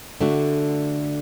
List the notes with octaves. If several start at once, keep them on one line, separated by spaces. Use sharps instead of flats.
D3 A3 D4 F#4